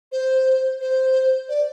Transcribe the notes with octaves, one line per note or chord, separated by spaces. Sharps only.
C5
C5
D5